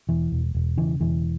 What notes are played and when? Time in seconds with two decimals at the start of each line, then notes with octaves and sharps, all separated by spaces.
0.09 E1 E3
0.32 E1
0.55 E1
0.77 C#3 E3
1.00 E1 E3